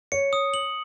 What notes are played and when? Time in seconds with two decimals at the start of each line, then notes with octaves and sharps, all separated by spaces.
0.12 C#5 C#7
0.33 D#6
0.54 F#7